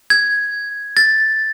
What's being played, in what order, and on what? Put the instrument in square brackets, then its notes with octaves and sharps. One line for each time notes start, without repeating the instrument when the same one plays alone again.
[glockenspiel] G#6
A6